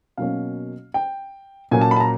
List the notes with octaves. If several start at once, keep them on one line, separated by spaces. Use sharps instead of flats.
B2 F#3 A#3 C#4 F5
G5
A#2 F#3 A#3 C#4 G#5
A5
B5
A5
A#5